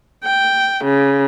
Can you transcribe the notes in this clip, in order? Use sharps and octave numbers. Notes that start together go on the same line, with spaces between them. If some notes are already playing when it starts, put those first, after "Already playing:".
G5
C#3